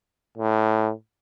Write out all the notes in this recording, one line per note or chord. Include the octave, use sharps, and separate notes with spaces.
A2